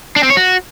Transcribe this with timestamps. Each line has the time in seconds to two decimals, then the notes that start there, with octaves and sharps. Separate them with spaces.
0.16 D4
0.23 C4
0.30 C#5
0.37 F#4